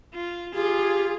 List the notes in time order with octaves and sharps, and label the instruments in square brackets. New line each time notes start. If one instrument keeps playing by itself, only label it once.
[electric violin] F4
[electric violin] F4 [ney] G4 [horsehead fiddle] G#4